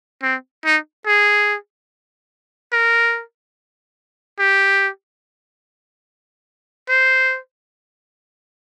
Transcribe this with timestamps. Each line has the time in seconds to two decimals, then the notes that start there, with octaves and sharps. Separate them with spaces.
0.23 C4
0.65 D#4
1.06 G#4
2.72 A#4
4.39 G4
6.89 C5